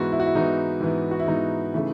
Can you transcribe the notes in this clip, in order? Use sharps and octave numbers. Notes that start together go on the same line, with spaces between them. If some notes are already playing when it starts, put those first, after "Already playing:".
Already playing: G#2 E3 B3 F#4
E4
F#4
E4
G#2 E3 B3 D#4
G#2 E3 B3
F#4
E4
G#2 E3 B3 D#4
C#3 E3 A3